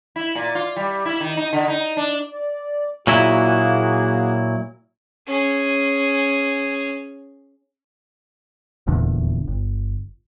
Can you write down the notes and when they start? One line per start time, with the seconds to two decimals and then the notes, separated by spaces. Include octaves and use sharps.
0.16 E4
0.35 A#2
0.55 F4
0.76 G3
1.05 E4
1.21 D#3
1.37 D#4
1.53 D3
1.68 D#4
1.97 D4
2.32 D5
3.07 A#2 F#3 A#3 E4 F#4 G#4
5.26 C#4 G#4
8.87 D#1 A#1 E2 D3
9.48 G1